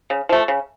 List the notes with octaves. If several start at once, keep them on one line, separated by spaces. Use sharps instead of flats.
C#3
F3 A3
C#3